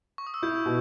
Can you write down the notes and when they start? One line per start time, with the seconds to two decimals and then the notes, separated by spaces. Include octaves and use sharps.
0.18 C#6
0.27 D#6
0.34 E6
0.42 E4 G6
0.66 B2